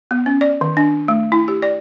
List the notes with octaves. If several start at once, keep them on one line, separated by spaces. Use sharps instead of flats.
B3
C#4
D5
D#3
D4
A3
E4
G4
D5